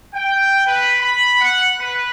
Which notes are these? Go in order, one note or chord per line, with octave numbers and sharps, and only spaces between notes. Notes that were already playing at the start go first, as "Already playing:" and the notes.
G5
B4
B5
F#5
B4